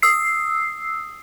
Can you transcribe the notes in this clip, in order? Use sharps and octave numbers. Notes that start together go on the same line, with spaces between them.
D#6 E6 C7